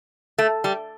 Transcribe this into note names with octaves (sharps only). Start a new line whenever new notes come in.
A3
G3